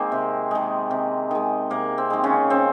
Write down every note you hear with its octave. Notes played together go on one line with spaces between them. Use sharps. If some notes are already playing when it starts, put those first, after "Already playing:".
Already playing: D#3 G#3 A#3 C4
C3
D#3 G#3
C3
D#3 G#3
C3 A#3
C4
D#3 G#3
C#3 C#4
C#3 C4